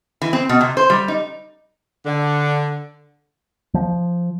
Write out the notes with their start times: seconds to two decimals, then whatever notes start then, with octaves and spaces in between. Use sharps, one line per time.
0.22 E3
0.33 C4
0.49 B2
0.61 C3
0.77 C5
0.90 G3
1.08 D#4
2.06 D3
3.74 F3